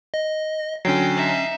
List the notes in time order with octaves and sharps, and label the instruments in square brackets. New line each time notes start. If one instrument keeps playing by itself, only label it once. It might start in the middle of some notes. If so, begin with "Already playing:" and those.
[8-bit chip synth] D#5
[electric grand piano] D3 F#3 [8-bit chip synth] C#4 C7 [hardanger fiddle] G5
[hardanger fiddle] D#4 E5